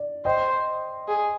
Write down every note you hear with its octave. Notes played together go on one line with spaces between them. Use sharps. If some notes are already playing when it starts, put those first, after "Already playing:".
Already playing: D5
C5 D#5 G5
G#4